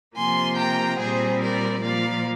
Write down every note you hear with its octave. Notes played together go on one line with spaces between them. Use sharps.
C3 F3 A#3 G#5 C6
G5 A#5
A#2 G3 C4 G#4 C5
A#4 D5
A#2 F3 A#3 D5 F5